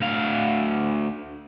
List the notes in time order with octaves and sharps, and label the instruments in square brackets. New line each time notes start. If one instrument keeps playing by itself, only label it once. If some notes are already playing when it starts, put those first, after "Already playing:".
[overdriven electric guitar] D2 F5